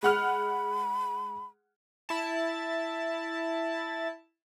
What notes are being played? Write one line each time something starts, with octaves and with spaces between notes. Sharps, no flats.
G#3 F#5 B5 F6
E4 A5